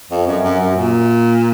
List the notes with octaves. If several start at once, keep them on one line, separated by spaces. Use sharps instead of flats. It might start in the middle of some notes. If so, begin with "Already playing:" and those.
F2
F#2
F#2
F#2
A#2